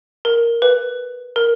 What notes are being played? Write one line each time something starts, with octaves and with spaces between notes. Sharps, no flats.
A#4
B4
A#4